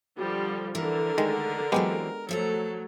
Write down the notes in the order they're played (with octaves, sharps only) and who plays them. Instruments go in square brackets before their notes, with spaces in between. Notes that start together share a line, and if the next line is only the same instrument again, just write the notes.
[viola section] D3 F3 G3
[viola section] D3 [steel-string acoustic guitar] E3 [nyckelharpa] A#4
[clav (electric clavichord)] D#3 G#3 [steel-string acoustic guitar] A3
[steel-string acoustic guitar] E3 F#3 C4 [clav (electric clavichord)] G#3 B3 G4
[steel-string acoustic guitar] F3 E5 A#5 [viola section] F#3 A3 [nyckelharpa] A4